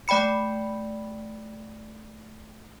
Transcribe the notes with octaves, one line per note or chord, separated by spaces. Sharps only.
A3 D5 G5 B5 C#7